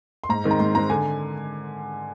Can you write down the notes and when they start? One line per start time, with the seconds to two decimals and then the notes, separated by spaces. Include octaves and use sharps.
0.24 C6
0.29 G#2 A#5
0.44 D#3 G#3 C4 D#4
0.51 A#5
0.59 G#2 C6
0.74 D#3 G#3 C4 D#4 A#5
0.90 D3 G#5